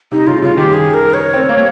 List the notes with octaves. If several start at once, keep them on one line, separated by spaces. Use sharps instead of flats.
C3 D#4
C#3 F4
C#3 F4
D#3 G4
G#4
A#4
C#5
C4
A#3